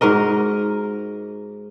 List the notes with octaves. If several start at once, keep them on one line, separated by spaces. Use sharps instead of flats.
G#2 F#4 A#4 D#5